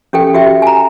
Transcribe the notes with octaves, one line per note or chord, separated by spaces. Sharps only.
C#4 G4 A4 G5
F#4 G4 E5 G5
G#5 A#5